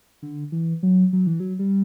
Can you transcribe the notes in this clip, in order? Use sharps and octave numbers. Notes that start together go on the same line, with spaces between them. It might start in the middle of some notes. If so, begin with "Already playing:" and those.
D3
E3
F#3
F#3
E3
F#3
G3